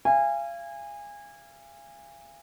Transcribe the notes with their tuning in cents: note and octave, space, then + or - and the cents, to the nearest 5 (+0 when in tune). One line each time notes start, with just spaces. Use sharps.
F5 -35 G#5 -25